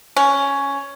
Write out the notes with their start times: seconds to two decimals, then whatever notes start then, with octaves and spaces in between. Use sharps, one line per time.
0.16 C#4